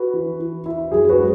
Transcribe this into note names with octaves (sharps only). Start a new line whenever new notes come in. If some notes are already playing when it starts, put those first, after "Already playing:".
Already playing: F#4 B4
E3
E3
E4
F#2 G#4
F#4 B4
G#3